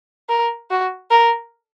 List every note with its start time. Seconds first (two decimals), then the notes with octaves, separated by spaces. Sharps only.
0.29 A#4
0.70 F#4
1.10 A#4